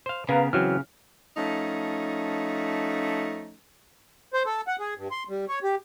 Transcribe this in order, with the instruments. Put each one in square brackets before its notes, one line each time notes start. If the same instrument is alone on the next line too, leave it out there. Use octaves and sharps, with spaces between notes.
[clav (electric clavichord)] C5 F5
[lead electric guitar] C#3 [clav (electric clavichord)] B3 A#4 G#5 [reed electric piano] B4 F5 A#5
[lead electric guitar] C#3 [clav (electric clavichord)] E3 F#3 C4 [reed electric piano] F6
[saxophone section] F3 A3 C#4 D#4
[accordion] C5
A4
F#5
G#4
G2
C6
G3
C#5
G4